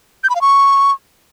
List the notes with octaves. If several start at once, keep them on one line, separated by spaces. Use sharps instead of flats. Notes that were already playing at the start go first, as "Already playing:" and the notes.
G6
B5
F5
C#6